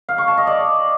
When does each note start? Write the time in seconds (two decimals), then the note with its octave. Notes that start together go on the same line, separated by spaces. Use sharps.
0.09 F5
0.18 C#6
0.28 A5
0.37 D#5
0.47 D5